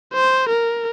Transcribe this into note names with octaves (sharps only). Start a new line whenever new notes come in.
C5
A#4